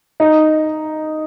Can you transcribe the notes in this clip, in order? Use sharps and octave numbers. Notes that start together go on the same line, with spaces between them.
D#4